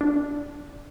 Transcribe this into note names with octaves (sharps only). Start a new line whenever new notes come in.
D4